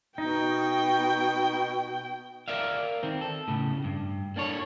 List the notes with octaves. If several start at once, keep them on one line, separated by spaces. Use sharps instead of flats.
B2 D#4 G5
A#4 D5 E5 F5
D#3 C4
A4
A2 C#3
G2
A#3 D4 A4 C#5